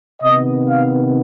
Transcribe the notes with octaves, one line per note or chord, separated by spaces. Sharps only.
C3 D#3 B3 D#5
F5